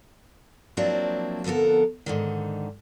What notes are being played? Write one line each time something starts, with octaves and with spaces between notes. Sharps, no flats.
F3 F#3 A#3 C4 D4 E4
F2 D3 B3 A4 A#4
G#2 D3 D#3